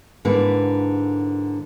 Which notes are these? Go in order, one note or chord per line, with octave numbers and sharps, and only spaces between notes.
G#2 D3 A#3 E4 B4